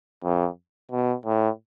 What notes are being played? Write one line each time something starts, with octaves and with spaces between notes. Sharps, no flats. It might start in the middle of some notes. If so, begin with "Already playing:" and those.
F2
B2
A2